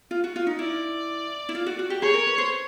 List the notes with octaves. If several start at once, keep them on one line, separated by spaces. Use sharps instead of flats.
F4
F#4
F4
D#4
E4 D5
E4
F4
F#4
F#4
G4
G#4 C#5
A#4
B4
C5